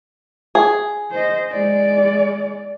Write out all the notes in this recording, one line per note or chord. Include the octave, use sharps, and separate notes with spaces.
G#4
C5 D#5
G#3 D5